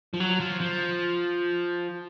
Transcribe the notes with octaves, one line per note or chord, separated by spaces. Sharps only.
F3
F#3
F3
F3